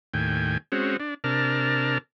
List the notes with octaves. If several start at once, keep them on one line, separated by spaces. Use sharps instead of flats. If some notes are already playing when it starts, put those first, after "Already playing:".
D#2 A2 G5 G#5
G#3 C4 C#4 F#4
D4
C3 D4 A#4 A5 F6